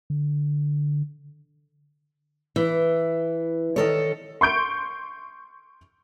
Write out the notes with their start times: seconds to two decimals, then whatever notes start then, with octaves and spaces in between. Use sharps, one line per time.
0.10 D3
2.56 E3
3.76 D#3 A4 C#5
4.41 C6 C#6 G6 D7